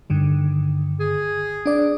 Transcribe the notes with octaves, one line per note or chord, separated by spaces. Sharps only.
G2 D3 D#3
G#4
D4 D5